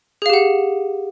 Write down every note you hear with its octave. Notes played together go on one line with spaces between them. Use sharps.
G4 G#4 F5 F#5